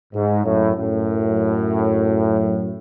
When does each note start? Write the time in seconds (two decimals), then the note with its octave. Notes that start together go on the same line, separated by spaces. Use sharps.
0.14 G#2
0.45 F#2 A2
0.76 F#2 A2